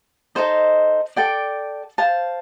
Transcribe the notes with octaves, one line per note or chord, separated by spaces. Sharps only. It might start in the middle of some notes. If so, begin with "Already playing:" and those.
D#4 A4 C5 D#5
A4 D5 G5
C5 F5 A5